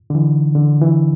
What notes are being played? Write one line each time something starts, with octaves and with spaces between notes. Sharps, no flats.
D3
E3
D3
E3